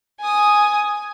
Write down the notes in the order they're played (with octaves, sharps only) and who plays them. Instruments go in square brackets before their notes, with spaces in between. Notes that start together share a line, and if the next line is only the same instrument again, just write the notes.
[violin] G#5 D#6